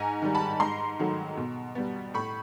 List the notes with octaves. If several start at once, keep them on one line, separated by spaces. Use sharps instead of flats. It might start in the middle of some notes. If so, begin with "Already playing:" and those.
Already playing: G#2 G#5 A#5
D#3 G3
A5 B5
G#2 A#5 C6
D#3 F#3 A3
B2
G3 B3
A2 B5 C#6